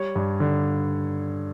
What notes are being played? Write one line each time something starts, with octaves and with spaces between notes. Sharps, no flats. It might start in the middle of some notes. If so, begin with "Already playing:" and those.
Already playing: G3 C#5
G2
D3